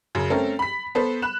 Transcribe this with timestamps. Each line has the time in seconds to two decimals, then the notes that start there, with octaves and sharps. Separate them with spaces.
0.15 F#2 C#3
0.30 A3 C4 C#4 A4 A#4
0.59 B5 B6
0.95 B3 A4 B4 C5
1.22 B5 F#6 E7